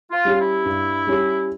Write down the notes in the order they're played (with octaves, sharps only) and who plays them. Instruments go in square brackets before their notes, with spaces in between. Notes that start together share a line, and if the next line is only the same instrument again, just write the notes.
[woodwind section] F4
[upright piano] G3 C#4 G4
[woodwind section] E4
[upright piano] G2
G3 C#4 G4